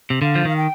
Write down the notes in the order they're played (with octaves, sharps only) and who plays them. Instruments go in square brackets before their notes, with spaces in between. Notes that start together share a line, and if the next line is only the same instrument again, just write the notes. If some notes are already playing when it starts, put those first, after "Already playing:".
[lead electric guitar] C3
[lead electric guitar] D3 [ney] F5
[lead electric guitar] F3
[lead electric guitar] D#3 [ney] F5
[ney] G5